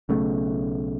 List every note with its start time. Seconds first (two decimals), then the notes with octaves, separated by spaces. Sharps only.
0.09 B1 C#3 A3